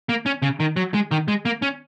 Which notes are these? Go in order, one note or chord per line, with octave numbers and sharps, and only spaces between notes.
A#3
C#4
C#3
D#3
F#3
G#3
D#3
G#3
A#3
C#4